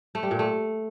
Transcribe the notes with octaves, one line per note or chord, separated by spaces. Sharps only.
A3
G3
A#2
A3